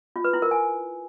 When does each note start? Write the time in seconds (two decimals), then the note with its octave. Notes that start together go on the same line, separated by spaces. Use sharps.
0.16 F4
0.24 B4
0.33 E4
0.42 A#4
0.51 G#5